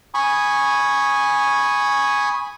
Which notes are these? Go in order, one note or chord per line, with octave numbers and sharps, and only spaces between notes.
G#5 B5 C#6 D#6